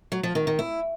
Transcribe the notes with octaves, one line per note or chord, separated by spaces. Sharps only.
F#3
F3
D#3
D#3
E4